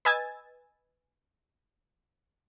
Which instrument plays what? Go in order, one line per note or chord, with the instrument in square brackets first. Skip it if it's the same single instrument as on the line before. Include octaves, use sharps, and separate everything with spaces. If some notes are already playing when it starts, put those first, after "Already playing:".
[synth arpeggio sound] B4 D#5 G#5 E6 G#6 A6